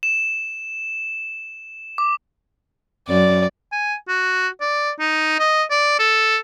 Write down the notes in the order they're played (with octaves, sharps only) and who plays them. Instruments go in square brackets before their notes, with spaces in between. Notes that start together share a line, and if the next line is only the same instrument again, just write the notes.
[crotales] E7
D6
[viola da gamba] F#2 [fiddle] D5
[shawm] G#5
F#4
D5
D#4
D#5
D5
A4